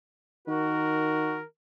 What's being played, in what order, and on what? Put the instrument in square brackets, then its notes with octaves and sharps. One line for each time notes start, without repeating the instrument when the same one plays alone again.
[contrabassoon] D#3 [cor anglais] F#4 [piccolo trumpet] A#4